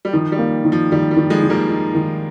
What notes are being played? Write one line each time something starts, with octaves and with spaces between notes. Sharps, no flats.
G3
D#3 F3
G3
A#3
D#3
F3
D#3 G3
G3
D#3
F3 G#3
D#3
G3 A#3
D#4
D#3